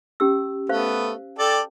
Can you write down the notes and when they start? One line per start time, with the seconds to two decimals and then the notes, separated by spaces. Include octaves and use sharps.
0.20 C#4 G4 E6
0.69 A3 B3 C5 F5
1.39 A4 D5 G5